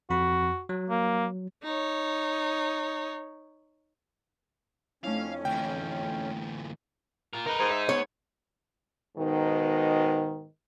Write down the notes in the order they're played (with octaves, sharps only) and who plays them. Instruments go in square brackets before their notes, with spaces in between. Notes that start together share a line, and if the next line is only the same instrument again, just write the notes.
[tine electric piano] F2 B5 [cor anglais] F#4
[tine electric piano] F#3
[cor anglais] A#3
[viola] D#4 C#5
[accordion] F2 C#4 [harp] A3 D4 E4 [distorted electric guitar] F5
[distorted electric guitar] D2 E3 [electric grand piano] G5
[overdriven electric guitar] F4 A#4
[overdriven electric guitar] D#4 [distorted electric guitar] A#4 B4
[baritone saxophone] G#2
[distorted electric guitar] E5
[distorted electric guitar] B3 [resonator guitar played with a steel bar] C#5
[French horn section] G#2 B2 D#3